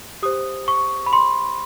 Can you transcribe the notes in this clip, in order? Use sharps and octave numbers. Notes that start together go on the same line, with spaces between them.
G4 C5 D#6
C#6
B5
C6